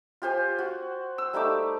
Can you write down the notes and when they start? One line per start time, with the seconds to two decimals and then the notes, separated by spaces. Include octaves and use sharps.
0.22 F4 G4 C5 G#5
0.59 F#4
1.18 E6
1.33 G3 A3 D#4 D6